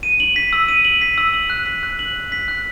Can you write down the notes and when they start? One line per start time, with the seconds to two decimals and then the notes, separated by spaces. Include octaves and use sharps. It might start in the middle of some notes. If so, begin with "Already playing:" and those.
0.03 D#7
0.20 F#7
0.36 B6
0.53 E6
0.68 D#7
0.85 F#7
1.01 B6
1.18 E6
1.34 F#7
1.50 F#6
1.66 B6
1.83 F#6
1.99 F#7
2.16 F#6
2.32 B6
2.48 F#6